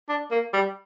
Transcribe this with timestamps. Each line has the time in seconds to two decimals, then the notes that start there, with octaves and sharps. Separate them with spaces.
0.09 D4
0.31 A#3
0.54 G3